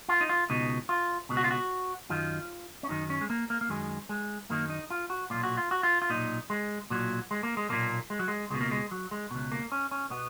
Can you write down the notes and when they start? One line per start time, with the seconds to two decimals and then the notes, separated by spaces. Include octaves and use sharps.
0.09 F4
0.21 D#4
0.29 F4
0.50 C#2 B2 D#4
0.89 F4
1.29 C#2 B2
1.37 F#4
1.44 F4
1.51 F#4
2.09 F#2 D#3 F4
2.83 C#4
2.89 F#2 D#3 D#4
3.10 C#4
3.21 G#3
3.30 A#3
3.50 A#3
3.61 A#3
3.69 F#2 D#3 G#3
4.09 G#3
4.49 F#2 D#3 A#3
4.70 D#4
4.90 F4
5.10 F#4
5.30 B1 A#2 F4
5.43 F#4
5.57 F4
5.71 F#4
5.83 F4
6.02 F4
6.10 B1 A#2 D#4
6.50 G#3
6.90 B1 A#2 F#3
7.31 G#3
7.43 A#3
7.57 G#3
7.70 B1 A#2 A#3
8.10 G#3
8.19 F#3
8.28 G#3
8.50 C#2 B2 G#3
8.61 A#3
8.71 G#3
8.91 F#3
9.11 G#3
9.31 C#2 B2
9.52 A#3
9.72 C#4
9.91 C#4
10.10 B2 B3